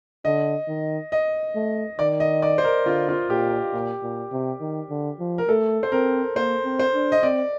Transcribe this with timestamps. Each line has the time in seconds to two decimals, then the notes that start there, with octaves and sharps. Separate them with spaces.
0.25 D3 D#5
0.68 D#3
1.12 D#5
1.55 A3
1.99 D#3 D5
2.20 D#5
2.42 D5
2.58 C5
2.64 A#4
2.86 D3 F4
3.09 F4
3.30 A#2 G4
3.73 A#2
4.03 A#2
4.32 C3
4.60 D#3
4.90 D3
5.20 F3
5.38 A#4
5.49 A3 A4
5.83 C5
5.92 C4 A#4
6.36 A#3 C5
6.65 C4
6.79 C5
6.94 D4
7.12 D#5
7.23 C4 D5